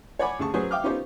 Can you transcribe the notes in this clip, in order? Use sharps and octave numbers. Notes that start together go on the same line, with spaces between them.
C#5 D5 F#5 G#5 B5 D6
D2 C#3 G#4 A5 C#6
F#3 C#4 G#4 B4 C5
E5 F5 G5 D6 D#6 F6
B3 C#4 D#4 F4 G4 C5